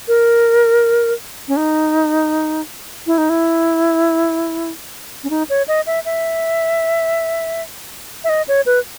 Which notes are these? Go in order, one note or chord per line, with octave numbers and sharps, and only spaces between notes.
A#4
C#4
D#4
E4
D#4
E4
C#4
D#4
C#5
D#5
E5
E5
E5
D#5
C#5
B4